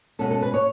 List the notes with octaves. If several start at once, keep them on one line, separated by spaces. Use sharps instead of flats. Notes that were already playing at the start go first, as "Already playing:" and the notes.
B2 G#3 C#4 A4
A4
B4
C#5